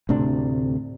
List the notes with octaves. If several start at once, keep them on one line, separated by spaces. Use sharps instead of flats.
D2 A2 C3 D4